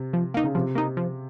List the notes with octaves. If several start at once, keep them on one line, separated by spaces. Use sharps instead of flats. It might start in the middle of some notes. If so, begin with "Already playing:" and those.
Already playing: C3
F3
A#3 D#4
C#3
C3 F3
A#3 D#4
F3